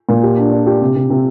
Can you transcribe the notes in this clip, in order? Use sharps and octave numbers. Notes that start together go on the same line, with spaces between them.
A#2
G4
D4
D4
G4
C3
C3
C3